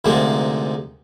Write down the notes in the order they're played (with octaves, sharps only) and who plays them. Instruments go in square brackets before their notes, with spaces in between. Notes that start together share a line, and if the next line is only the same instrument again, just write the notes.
[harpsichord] D2 G#2 C3 F3 G#3 A#3